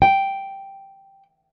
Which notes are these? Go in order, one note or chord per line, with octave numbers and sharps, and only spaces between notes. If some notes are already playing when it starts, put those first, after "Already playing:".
G5